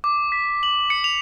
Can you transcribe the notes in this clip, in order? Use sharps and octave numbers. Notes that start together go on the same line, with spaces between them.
D6
B6
F#7
C#7
F7